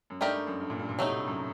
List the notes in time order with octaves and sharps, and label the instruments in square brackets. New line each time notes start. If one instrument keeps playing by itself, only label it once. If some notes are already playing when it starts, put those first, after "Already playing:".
[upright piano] F#2
[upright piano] G2 [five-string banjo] A3 D#4 G4 A#4 D5
[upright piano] G2
F#2
G2
A#2
G2
A#2
[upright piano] C3 [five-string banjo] F#3 A3 D#4
[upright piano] A2
G2
F#2